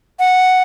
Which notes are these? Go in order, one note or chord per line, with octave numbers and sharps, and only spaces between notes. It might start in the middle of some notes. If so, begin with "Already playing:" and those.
F#5